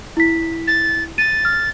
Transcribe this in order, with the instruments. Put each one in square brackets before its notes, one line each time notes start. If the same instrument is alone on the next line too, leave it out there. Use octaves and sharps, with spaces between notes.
[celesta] E4 B6
[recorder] A6
[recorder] A6 [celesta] D#7
[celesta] F6